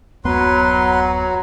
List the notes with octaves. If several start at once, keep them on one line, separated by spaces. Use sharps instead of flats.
D1 F#2 F#3 B3 B4 A#5 C6